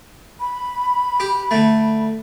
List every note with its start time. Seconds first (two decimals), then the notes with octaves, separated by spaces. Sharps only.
0.40 B5
1.20 G4
1.51 D3 A3